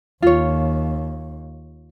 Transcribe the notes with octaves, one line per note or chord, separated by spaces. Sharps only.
D#2 F4 C#5